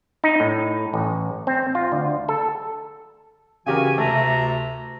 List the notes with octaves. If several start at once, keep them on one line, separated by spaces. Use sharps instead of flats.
D#4
A2
A1
C4
F4
D2
A4
C#3 E3 F#4 G4 A#4 G#5
D2 C3 A3 A4 A#5